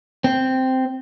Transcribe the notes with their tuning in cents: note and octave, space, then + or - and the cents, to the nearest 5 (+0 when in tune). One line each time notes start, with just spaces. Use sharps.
C4 -5